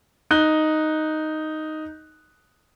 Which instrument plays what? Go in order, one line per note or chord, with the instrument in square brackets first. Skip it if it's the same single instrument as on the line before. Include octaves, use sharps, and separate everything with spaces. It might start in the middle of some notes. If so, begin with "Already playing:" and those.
[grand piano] D#4 F#6 G7